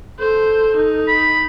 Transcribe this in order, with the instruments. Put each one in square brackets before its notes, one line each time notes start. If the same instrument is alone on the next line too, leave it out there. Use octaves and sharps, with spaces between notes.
[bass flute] A4 [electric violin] C5
[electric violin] D#4
[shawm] B5